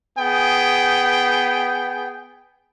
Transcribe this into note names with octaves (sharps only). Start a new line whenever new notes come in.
B3 G#4 G5